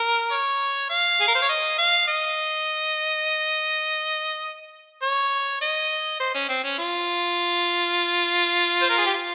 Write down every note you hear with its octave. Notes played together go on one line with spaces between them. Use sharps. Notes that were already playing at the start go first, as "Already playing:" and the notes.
Already playing: A#4
C#5
F5
G#4
A#4
C5
C#5
D#5
F5
D#5
C#5
D#5
C5
C#4
C4
C#4
F4
C5
A#4
G#4
G4
F4